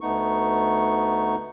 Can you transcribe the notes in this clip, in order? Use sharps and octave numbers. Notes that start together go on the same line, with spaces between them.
D2 A3 B3 D#4 C#6